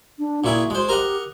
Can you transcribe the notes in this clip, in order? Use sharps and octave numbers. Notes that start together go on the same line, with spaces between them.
D4
A#2 E4 F#4 G#4
G#3 C5
G4 A#4 D#5 F#5